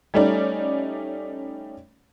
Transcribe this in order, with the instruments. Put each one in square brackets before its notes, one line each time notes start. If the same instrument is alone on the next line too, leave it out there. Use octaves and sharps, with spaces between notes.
[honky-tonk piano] G3 A3 C#4 D#4 D5